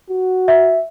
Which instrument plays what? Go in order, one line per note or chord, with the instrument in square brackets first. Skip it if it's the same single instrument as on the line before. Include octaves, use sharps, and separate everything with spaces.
[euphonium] F#4
[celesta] E5